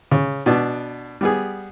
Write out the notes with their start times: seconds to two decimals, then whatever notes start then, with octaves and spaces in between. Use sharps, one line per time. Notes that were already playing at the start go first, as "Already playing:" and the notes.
0.11 C#3
0.46 B2 B3 D4
1.21 G3 B3 G#4